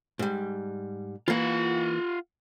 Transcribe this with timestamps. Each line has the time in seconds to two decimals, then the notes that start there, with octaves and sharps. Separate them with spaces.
0.19 G#2 G3
1.28 E3 A#3 F4 F#5